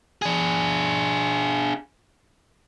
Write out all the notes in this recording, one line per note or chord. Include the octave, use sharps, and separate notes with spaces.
D4 G#4